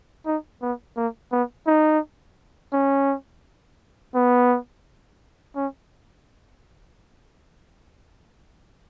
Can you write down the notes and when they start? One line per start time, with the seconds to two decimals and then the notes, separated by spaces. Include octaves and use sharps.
0.26 D#4
0.62 B3
0.97 A#3
1.32 B3
1.67 D#4
2.73 C#4
4.15 B3
5.56 C#4